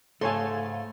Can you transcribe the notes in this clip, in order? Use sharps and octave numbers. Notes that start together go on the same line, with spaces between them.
G#2 C#3 A3 A4 C#5 F5 G#5 C6